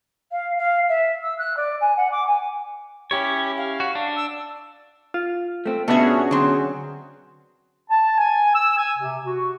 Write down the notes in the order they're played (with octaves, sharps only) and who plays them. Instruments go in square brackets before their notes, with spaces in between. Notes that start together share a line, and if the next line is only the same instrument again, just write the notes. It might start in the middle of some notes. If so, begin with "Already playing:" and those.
[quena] F5
F5
E5
E6
F#6
D5
G#5
F#5
D6
G#5
[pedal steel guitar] C#4 E4 C#5 [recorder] G4
[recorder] F5
[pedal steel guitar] F#4
D4
[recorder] E6
[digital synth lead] F4
[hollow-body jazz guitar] A3 C4
[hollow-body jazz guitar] B2 B3 D4 [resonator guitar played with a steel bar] A3 E5 [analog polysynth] C#4 F#4 G#4
[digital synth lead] D3 [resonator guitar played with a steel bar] F#3 C4
[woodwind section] A5
G#5
E6
G#5
C3
F#4